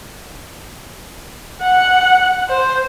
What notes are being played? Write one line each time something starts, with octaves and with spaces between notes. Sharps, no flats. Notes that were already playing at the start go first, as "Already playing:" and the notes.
F#5
C5